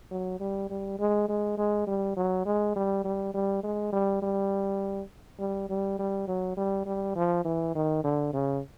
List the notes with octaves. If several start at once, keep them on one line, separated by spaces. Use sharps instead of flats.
F#3
G3
G3
G#3
G#3
G#3
G3
F#3
G#3
G3
G3
G3
G#3
G3
G3
G3
G3
G3
F#3
G3
G3
F3
E3
D#3
D3
C#3